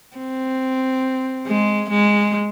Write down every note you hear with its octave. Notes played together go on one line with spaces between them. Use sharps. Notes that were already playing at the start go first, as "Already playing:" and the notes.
C4
G#3
G#3